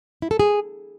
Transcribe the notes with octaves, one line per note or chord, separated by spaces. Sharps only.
E4
A4
G#4